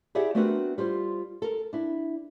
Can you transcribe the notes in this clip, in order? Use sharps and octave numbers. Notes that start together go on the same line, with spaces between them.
E4 G4 G#4 D5 E5 F#5
A3 B3 C4 D4 F#4 A#4
G3 F4 C5
A4 A#4
D4 E4